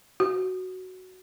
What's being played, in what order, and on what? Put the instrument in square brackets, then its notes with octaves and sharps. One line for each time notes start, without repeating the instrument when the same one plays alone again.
[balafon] F#4